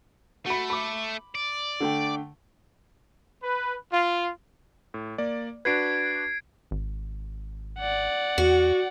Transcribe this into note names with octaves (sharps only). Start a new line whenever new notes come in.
A3 F#4 B5
B5 D6
D5
D3 A3 G5
B4
F4
A2
A#3 D5
D4 F#4 B4 G#6 C7 D7
G#1
D5 F#5
E2 F#4